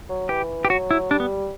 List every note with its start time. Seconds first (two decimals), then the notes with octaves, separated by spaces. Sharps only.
0.09 F#3
0.29 E3 G4
0.65 G4
0.70 F#3 F#4
0.91 E4
1.10 G3 D4
1.20 B3